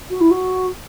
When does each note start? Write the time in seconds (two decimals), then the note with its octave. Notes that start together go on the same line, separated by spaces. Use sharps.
0.10 F#4
0.20 E4
0.31 F#4